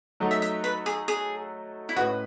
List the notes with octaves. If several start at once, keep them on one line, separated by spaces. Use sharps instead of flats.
F#3 A3 D#4 F#4 A4
E5
E5
B4
G#4
G#4
E4
A2 G#3 C#4 F#4 G#4 B4